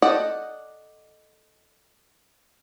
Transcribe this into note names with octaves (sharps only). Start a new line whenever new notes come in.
A4 D5 D#5 F#5 G5